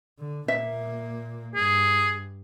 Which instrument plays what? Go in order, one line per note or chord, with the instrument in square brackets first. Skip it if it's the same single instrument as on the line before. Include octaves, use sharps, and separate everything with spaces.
[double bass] D3
[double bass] A#2 A#3 [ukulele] E5
[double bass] G2 [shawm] G#4